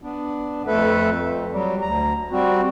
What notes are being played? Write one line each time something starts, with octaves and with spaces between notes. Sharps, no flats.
B3 D4
F2 A3 A4 B4 E5
F2
F#3 G3
D2 A#5
G3 C4 F#4